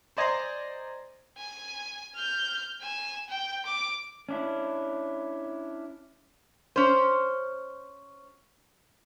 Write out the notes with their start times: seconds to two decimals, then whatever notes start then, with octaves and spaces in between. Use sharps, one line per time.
0.17 C5 D5 D#5 G#5 A#5 C6
1.37 G#5
2.15 F6 G6
2.81 G#5 E7
3.29 G5
3.66 D6
4.29 C#4 D4 E4
6.76 C#4 C5